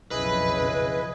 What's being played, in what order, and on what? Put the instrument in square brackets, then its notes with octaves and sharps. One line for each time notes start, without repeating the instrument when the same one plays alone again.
[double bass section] B1 F2 C#3 [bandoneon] E4 G#4 D#5 [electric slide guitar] B4